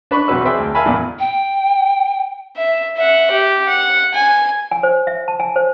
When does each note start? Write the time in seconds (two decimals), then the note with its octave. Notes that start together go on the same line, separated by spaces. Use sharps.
0.11 D4 B4 B5 C#6
0.28 B1 E2 C3 F#3 B4 E6
0.45 G#4 B4 C5 D5 E5 G5
0.59 D2
0.75 A#4 E5 F5 G#5 A5 B5
0.86 A#1 E2 A#2
1.19 G5
2.57 E5
2.97 E5 F#5
3.31 G4
3.68 F#5
4.14 G#5
4.71 G#5
4.83 C5
5.07 E5
5.28 A5
5.40 G#5
5.56 C5